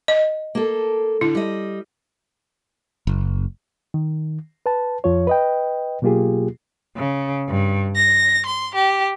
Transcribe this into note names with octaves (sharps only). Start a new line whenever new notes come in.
D#5
A#3 A4
D3 E4
G3 D#5
F#1
D#3
B4 A5
F2 F3 F4 C#5
B4 D#5 G5
B2 F#3 A#3 F4 G4 G#4
C#3
G2
A#6
C6
G4